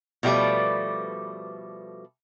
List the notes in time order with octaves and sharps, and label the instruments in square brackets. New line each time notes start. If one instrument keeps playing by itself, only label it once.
[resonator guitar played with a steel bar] B2 F3 G3 A3 B4 D5